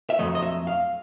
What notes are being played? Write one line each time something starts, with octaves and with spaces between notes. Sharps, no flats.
E5
F2 D3 F#3 A3 D#5
D#5
E5
F5